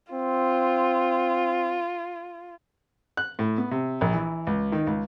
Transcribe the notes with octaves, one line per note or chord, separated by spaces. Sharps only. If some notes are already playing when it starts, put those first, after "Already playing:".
C4 F4
F#6
A2
B3
C3
A#1
E3
C#2
D#3
C#2